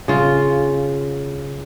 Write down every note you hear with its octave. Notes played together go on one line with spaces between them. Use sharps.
C#3 F4